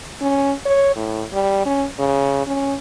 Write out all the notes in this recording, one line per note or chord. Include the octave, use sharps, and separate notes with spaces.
C#4
C#5
A2
G3
C#4
C#3
C#4